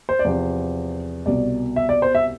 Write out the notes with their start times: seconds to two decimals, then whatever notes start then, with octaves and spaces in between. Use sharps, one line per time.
0.09 C5
0.19 D5
0.25 E2 C3 F3 C5
1.26 C2 B2 D5
1.76 E5
1.89 D5
2.02 C5
2.15 E5